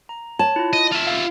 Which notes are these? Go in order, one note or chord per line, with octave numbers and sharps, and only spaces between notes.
A#5
C#5 A5
E4 F4
D#5 A#6
F4 E5
F5